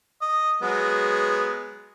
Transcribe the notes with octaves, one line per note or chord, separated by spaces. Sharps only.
D#5
F#3 G#3 B3